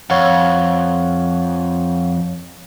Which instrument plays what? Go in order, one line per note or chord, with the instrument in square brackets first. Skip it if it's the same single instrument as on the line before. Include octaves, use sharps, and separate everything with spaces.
[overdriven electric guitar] F2 [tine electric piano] C#5 F5 F#5